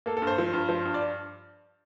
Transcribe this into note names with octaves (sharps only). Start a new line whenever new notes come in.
A#3 A4
A4
G2
C5
F3
G2
F3
G2
D5